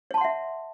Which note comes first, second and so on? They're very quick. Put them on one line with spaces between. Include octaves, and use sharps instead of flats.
C#5 A5 C6 F#5 E5